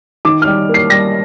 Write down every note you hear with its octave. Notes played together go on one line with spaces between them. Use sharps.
D#3 D6
F6
G3
A#3 C7
G3 A#6